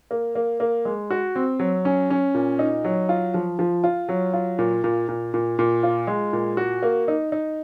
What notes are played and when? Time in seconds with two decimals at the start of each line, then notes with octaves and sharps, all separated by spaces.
0.11 A#3
0.35 A#3
0.60 A#3
0.85 G#3
1.11 F#4
1.35 C4
1.59 F#3
1.85 C#4
2.10 C#4
2.35 A#2
2.59 D#4
2.84 F#3
3.09 F4
3.34 F3
3.59 F3
3.84 F4
4.09 F#3
4.34 F4
4.59 A#2
4.84 A#2
5.09 A#2
5.34 A#2
5.59 A#2
5.83 F4
6.07 G#3
6.33 A#2
6.57 F#4
6.82 A#3
7.08 D#4
7.32 D#4